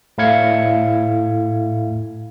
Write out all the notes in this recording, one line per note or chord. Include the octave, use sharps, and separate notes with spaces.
A2 E4 F5 G#6 C#7